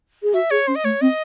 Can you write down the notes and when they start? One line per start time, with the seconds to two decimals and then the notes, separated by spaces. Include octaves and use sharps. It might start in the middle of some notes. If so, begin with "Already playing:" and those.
0.23 G#4
0.34 F#4 E5
0.51 G#4 C#5
0.67 C#4 C5
0.76 D#5
0.84 A3 C#5
1.01 C4 D#5